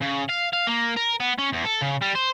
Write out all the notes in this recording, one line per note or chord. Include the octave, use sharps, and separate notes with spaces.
C#3
F5
F5
A#3
A#4
B3
C#4
E2
A4
C#3
G3
C5